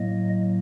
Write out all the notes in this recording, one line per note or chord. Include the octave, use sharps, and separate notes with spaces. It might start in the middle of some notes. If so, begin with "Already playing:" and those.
Already playing: A2 F#3 A#3 D#5